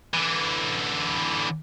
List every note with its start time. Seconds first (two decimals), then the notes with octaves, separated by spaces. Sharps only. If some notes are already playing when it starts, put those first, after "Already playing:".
0.14 D3 E3